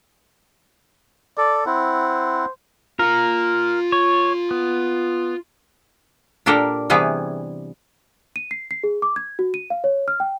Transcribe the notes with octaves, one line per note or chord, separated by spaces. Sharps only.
A4 D5
C4 E4 C5 F#5
F4 A#4 A#5
C#5
B3
A#2 D4 G4 A4 A#4
C3 E3 G3 B3 G#4
D#7
C7
C7
G#4
D6
G#6
F#4
D#7
F5
C#5
F6
G5